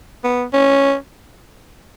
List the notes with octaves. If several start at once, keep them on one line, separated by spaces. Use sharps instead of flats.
B3
C#4